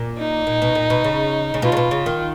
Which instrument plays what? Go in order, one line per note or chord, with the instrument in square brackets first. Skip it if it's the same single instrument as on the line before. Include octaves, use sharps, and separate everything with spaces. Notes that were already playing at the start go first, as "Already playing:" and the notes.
Already playing: [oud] A#2
[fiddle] D#4
[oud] A#2
B2
A#2
B2
C#3
C#3
[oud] B2 [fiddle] F4
[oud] C#3
B2
C#3
D#3